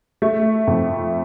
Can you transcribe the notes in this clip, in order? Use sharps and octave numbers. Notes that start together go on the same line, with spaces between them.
A3
F2